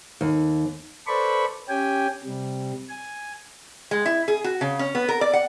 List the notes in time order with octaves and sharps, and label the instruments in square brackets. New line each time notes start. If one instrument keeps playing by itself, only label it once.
[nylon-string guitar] D#2
[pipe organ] A4 B4 C5 D5 B5 C#6
C#4 G4 G5 G#5
C3 G3
G#5
[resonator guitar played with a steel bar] G#3
E4
G#4
F#4
C#3
C#4
B3
A#4
D5
F#5